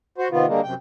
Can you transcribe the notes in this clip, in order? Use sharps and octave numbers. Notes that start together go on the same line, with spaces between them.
F#4 C5
C3 D#3 B3 F4
D3 G3 G#3 A#3
F#2 C3 G5